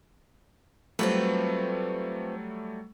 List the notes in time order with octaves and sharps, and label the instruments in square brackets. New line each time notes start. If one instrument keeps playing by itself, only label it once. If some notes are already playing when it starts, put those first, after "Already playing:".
[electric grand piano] F#3 G3 A3 [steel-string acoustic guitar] C4 F4 B4